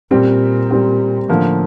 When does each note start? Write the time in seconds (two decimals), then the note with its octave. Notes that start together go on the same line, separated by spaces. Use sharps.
0.11 A#2 G3 C4 G4
0.71 G3 C4 G4
1.29 A2 D3 F3 A#3